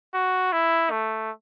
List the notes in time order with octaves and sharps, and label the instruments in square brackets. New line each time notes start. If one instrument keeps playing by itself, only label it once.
[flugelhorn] F#4
E4
A3